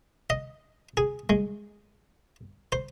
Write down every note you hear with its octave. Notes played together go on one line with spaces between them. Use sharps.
D#5
G#4
G#3
C5